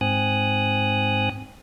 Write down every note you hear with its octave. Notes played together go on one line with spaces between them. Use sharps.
G#2 C4 G#5 D#6 F#6